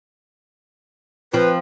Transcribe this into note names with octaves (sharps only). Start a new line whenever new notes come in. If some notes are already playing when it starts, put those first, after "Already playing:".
F3 C4 B4